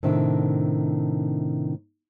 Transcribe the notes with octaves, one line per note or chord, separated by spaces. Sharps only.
A2 C3 D#3 D4 E5